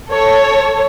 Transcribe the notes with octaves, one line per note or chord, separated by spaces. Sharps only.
A4 C#5